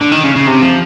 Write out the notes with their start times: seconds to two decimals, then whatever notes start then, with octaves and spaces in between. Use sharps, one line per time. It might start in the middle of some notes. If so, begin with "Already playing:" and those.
0.01 D3
0.12 D#3
0.24 C#3
0.36 C#3
0.47 C3
0.62 F3